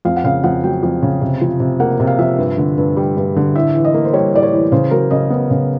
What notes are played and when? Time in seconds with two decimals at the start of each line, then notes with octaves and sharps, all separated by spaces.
0.05 F2 F5
0.16 F#5
0.24 C#3 F5
0.44 F2 F#5
0.64 F#3 G5
0.83 F2
1.02 C#3
1.21 C3
1.41 F3
1.60 C3
1.80 A#3 F#5
2.00 C3
2.07 F5
2.19 F3 E5
2.38 G2
2.58 D3
2.78 G2
2.97 G3
3.17 G2
3.36 D3
3.55 A2 E5
3.75 E3
3.85 D#5
3.94 A#3
4.05 C5
4.13 G3 C#5
4.33 A2 D5
4.43 C#5
4.53 E3
4.72 C#3 C5
4.91 F#3 A#4
5.11 C#3 D#5
5.30 B3
5.50 C#3